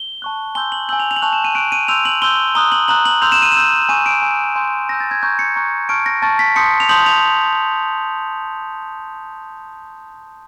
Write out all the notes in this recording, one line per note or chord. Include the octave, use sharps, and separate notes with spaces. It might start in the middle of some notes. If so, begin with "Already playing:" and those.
Already playing: G7
A5 C#6 F#6
G#5 C6 E6 G6 G7
F#7
G#5 C6 E6 G6 F#7
F7
F7
F#7
A5 C#6 F#6 F7
E7
D#7
A5 C#6 F#6 D7
D#7
C6 E6 G6 F7
F#7
C6 E6 G6 G7
A#5 D#6 F#6 G7
F#7
A#5 D#6 F#6 F#7
F#7
C6 E6 G6 F7
E7
D#7
C6 E6 G6 E7
G#5 C#6 E6 D#7
D7
G#5 C#6 E6
G#5 C6 E6 G6
G#5 C6 E6 G6 A#6
A6
G#6
A#5 C#6 F#6 G6
C#7
A#5 C#6 F#6
A5 C#6 F6 D7
A#6
A5 C#6 F6 A6
B6
A5 C6 D#6 G6 C#7
F7
A5 C6 D#6 G6 F#7
F7